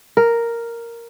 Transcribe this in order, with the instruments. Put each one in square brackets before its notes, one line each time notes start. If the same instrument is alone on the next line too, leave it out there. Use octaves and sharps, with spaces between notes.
[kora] A#4